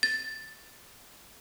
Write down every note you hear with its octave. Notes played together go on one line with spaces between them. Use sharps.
A6